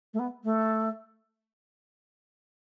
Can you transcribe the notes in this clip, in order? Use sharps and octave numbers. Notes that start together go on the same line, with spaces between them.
A3
B3
A3